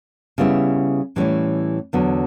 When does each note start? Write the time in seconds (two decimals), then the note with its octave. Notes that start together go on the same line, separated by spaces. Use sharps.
0.38 C#3 G3 B3 E4
1.16 A2 E3 G3 C#4 E4
1.93 E2 D3 F#3 B3